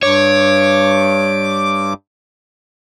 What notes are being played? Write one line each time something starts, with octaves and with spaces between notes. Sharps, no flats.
G2 C#5 D6